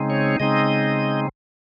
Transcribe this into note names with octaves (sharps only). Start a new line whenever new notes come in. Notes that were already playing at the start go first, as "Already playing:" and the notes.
Already playing: C#3 G#3 C4 D#4
C#5
C#3 G#3 C4 D#4 D#5